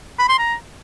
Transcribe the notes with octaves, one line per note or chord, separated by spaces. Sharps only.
B5
C6
A#5